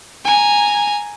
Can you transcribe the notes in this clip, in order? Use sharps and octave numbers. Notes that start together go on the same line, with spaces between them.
G#5 A#5